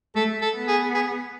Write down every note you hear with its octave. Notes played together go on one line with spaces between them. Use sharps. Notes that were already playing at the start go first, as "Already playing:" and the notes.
A3 A4
A4
B3
G#4
G#4